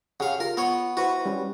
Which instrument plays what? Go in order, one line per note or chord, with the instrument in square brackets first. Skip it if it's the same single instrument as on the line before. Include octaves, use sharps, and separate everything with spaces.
[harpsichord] C#3 F5 [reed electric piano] G4 F#5
[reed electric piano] F4 [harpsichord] A#4
[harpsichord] B3 C#5
[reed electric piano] E4 B4 C5 [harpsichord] F#4
[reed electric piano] G3 C#4